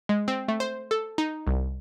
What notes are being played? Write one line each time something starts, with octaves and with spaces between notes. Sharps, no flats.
G#3
C4
A3
C5
A4
D#4
C2